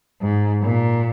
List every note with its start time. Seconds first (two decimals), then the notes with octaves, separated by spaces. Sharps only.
0.22 G#2
0.63 A#2